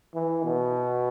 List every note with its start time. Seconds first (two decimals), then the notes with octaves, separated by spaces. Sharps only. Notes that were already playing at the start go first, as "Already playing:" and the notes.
0.15 E3
0.43 B2